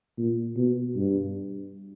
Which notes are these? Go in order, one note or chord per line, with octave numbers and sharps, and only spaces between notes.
A#2
B2
G2